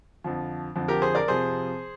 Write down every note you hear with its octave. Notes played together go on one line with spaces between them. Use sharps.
F2 D3 F3
F2 D3 F3
G4 A#4
G#4 C5
A#4 D5
F2 C3 F3 G#4 C5